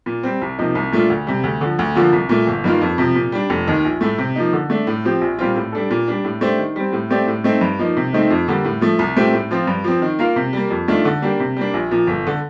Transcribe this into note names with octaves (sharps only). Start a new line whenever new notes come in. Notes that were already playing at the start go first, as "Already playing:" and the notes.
A#2
G3 C4
C2
C3 F3 A#3 D#4
C2
A#2 A3 D4 F4
D2
C3 G3
D2
D3 F3
D2
D3 F3 A#3 F4
C2
A#2 A3
G1
G2 D#3 A#3 F4
F2
C3 F3
A#2
G3 D4
F1
D#2 D#3
A#1
A2 A3
C3
F3 A#3 D#4
D3
A3 D4
A2
F3 C4 G4
A#1
A#2 G3 C4 F4
A2
G3 D4 A4
A#2
G3 D4
A2
A3 D4 G4 C5
D#3
G3 C4
A2
A3 C4 G4 D5
A2
A3 C4 D#4
G2
F3 A#3 D#4
C3
D#3 A3 C4 D#4
F2
D3 G3 A#3
A2
F3 A3
C2
A#2 A3 C4 G4
A2
F3 C4 F4
G2
F3 C4
D#3
A#3 F4 A#4 F5
C3
G3 A#3
F2
D#3 A3 D4 F4
D3
G3 A#3 D4 G4
C3
G3 A#3 D4
A#1
A#2 F3
G1
D3